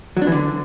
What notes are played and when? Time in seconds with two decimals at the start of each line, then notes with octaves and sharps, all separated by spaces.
0.17 F#3
0.22 D4
0.27 E3
0.32 D3